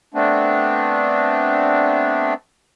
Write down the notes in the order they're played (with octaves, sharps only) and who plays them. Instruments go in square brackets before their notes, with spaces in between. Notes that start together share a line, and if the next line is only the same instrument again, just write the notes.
[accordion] A3 B3 C4 D4